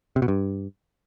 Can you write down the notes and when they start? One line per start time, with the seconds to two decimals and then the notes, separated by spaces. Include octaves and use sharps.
0.16 C3
0.22 B2
0.28 G2